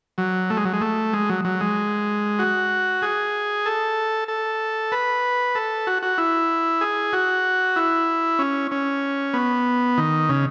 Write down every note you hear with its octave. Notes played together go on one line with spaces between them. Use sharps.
F#3
A3
G#3
F#3
G#3
A3
G#3
F#3
F#3
G#3
F#4
G#4
A4
A4
B4
A4
F#4
F#4
E4
G#4
F#4
E4
C#4
C#4
B3
D#3
C#3